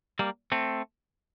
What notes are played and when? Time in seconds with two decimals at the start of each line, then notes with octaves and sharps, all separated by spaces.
0.19 G3 A#3
0.52 A3 C4